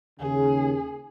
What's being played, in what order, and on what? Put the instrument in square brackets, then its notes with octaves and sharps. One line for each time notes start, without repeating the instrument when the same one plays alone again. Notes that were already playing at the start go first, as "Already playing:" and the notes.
[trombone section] D#2 C#3 [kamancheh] G#4